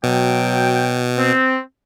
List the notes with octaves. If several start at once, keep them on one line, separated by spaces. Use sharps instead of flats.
B2 F#3 G5
C4